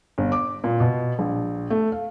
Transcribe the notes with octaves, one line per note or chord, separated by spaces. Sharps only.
G1
D6
A#2
B2
A#1
A3
F5